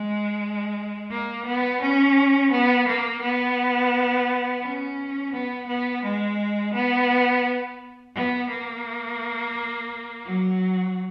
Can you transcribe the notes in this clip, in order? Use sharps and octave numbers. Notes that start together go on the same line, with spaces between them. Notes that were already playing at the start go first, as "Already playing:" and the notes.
Already playing: G#3
A#3
B3
C#4
B3
A#3
B3
C#4
B3
B3
G#3
B3
B3
A#3
F#3